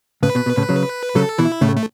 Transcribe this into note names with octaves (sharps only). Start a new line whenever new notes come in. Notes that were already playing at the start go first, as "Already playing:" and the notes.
A2 C#3 B4
B2
B2
A2 C#3
C#3 F#3
C#3 F#3 A4
B2 E3 E4
A2 C#3 A3
A3